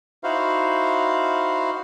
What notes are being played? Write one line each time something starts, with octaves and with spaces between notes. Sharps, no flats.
D#4 E4 F#4 C5 F5